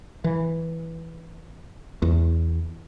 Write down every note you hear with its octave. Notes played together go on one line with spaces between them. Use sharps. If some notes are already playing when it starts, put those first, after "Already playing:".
E3
E2